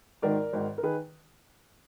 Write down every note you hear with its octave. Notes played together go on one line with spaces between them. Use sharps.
G#1 G#2 D#3 A#4 D5
G#1 G#2 D#3
A#4
D#3 G#4 B4